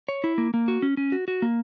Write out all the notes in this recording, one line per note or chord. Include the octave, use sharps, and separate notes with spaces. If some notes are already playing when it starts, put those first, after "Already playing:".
C#5
E4
A#3
A#3
F#4
C#4
C#4
F#4
F#4
A#3